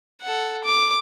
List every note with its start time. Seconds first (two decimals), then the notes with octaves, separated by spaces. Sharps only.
0.22 A4 F#5
0.64 D6